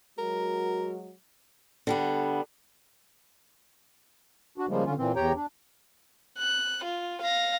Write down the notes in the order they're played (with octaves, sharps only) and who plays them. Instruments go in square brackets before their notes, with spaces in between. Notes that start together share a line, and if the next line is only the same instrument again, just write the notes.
[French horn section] F#3 G#3 F#4 [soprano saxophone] A#4
[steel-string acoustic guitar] D3 G3 B3
[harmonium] D4 F#4
C#3 F3 G3 G#3 A#3
D3 C#4 F4
A#2 E3 C4
E2 G4 C#5 G5 A#5
D4
[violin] F#6
F4
F5 A#6